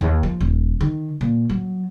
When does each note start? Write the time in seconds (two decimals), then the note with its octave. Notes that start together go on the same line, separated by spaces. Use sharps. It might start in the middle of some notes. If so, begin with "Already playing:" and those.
0.01 D#2
0.23 F3
0.40 D#1
0.81 D#3
1.21 A#2
1.50 F#3